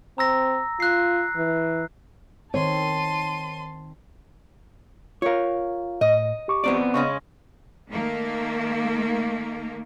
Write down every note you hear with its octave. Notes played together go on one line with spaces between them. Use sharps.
C4 A#5 E6 A#6
F4 F#6 C7
E3
D#3 C4 C#5 A5 C6 D#7
F4 A#4 C#5 F5
A2 D#5
G4 C#6 D6
B3 C4 D5
C#3 G#3 C#4 C#6
D#3 A3 A#3